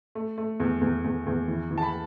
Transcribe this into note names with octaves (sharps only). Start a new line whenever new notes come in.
A3
A3
E2
E2
E2
E2
E3
E3
A5
B5